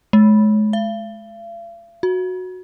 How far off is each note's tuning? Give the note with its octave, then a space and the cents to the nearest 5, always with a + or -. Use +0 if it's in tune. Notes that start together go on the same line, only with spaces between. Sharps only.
G#3 +40
F5 -45
F#4 -10